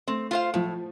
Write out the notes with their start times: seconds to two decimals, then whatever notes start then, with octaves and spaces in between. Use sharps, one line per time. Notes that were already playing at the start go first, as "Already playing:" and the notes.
0.08 A3 C4
0.31 F4 C5 F5
0.54 A2 F3